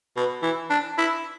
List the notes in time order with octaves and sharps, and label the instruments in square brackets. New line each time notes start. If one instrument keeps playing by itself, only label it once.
[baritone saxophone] B2
E3
D4
E4